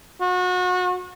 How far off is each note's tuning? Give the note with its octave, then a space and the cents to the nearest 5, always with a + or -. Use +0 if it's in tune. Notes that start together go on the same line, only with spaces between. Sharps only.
F#4 -30